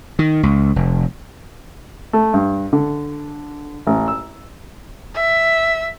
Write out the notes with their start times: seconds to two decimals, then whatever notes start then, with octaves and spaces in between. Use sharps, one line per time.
0.19 D#3
0.43 C#2
0.76 F1
2.13 A3
2.34 G2
2.73 D3
3.87 A1
4.08 E6
5.15 E5